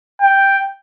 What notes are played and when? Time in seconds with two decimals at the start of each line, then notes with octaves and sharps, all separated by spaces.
0.22 G5